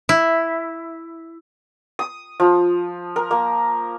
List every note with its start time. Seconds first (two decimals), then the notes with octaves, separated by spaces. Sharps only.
0.09 E4
1.99 D#6
2.40 F3
3.16 A#4
3.31 A#3